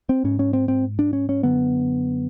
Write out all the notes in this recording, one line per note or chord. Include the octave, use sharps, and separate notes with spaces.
C4
G#2 C#4
C#4
C4
C4
D4
C#4
C#4
F#2 D3 B3